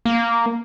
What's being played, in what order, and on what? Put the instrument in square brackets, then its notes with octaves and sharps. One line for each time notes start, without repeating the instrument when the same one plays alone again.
[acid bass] A#3